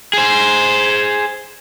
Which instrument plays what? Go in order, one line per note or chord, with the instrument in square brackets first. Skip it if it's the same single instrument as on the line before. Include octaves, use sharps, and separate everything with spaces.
[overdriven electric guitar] G#4 C5